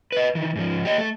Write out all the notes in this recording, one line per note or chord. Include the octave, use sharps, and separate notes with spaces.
B4 D#5
D#3 E3
G#2 F3
G4 D#5
A3 A4